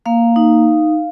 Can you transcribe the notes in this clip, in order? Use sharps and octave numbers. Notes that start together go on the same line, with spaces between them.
A#3 F5
D#4